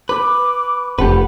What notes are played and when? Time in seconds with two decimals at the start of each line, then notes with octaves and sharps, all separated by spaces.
0.09 B4 D6
0.99 F1 G4 A4 B4 F#5